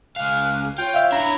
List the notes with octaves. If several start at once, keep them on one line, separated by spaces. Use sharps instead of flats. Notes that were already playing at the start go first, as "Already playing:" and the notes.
C#2 F5 G#5 F6 F#6
F4 C#5 G5
E5 F5
D4 E4 A#5 B5